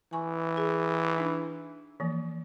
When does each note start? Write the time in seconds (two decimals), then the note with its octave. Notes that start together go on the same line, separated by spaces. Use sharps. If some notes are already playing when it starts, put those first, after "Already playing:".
0.13 E3 G#5 C#6
0.57 G#4
1.17 D4 D#4
2.00 E3 F3 A#3